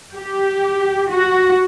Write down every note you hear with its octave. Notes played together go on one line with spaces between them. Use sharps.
G4
F#4